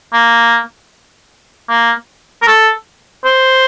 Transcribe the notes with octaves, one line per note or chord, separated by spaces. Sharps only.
A#3
A#3
A#4
A4
C5